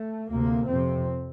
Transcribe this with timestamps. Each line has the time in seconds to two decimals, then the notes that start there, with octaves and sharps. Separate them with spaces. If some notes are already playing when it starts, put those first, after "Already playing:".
Already playing: A3
0.29 D2 C3 A#3
0.67 F2 C3 C4